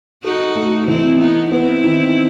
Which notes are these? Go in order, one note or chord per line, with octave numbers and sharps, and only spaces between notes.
D#4 F#4 A4
A3
E3 C4 E4
B3 D#4 E4
B3 C4 E4
D#3